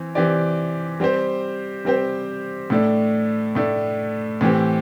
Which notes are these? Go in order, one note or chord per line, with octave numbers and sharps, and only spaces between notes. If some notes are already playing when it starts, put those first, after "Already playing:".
Already playing: E3 C4
E3 C4 G4 D5
G3 C4 G4 C5
G3 C4 G4 C5
A2 A3 D4
A2 A3 D4
A2 E3 C4 G4